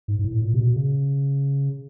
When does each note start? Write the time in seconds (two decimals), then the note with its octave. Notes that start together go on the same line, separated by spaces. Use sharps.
0.08 G#2
0.19 G#2
0.24 A2
0.42 A#2
0.54 C3
0.60 B2
0.76 C#3